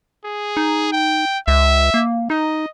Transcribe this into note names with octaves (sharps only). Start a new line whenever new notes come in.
G#4
D#4
G5
C#2 E5
A#3
D#4 D#5